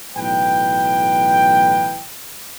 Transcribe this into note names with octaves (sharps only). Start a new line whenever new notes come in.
B1 A2 E3 B4 G5